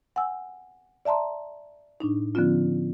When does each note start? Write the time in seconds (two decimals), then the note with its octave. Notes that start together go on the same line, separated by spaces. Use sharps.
0.16 F#5 G#5 E6
1.05 D5 E5 A5 A#5 C6
2.00 A2 D4 D#4
2.35 D3 F3 B3 C#4 F4